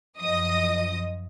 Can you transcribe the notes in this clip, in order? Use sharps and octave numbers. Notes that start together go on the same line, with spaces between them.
F#2 F3 D#5 D#6